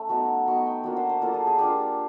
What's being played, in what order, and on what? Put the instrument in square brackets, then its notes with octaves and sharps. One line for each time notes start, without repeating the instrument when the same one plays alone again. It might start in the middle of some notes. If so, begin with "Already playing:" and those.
Already playing: [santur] A3 C#4
F#3 B3 D#4
F#3 B3 D#4 C#6
G5
F#3 A#3 D4 F4
C5
C5
F#3 A#3 D4 F4 A4
G#4
G#4
A#3 D4 F4 G4